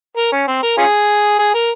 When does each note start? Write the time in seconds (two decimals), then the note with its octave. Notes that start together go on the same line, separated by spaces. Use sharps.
0.17 A#4
0.32 C#4
0.47 C4
0.63 A#4
0.78 C#4 F4 G#4
1.39 G#4
1.54 A#4